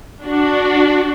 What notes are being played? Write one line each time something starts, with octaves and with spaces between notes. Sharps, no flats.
D4 F#4